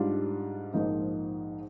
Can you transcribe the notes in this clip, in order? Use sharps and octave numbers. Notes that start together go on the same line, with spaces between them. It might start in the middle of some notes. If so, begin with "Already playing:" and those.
Already playing: G#2 G3 D4 F4
A#1 G#2 F3 A#3 D#4